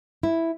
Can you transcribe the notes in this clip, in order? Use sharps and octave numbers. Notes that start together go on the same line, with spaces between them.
E4